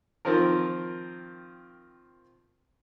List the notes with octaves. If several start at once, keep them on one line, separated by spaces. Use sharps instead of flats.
D#3 F3 C4 F4 A#4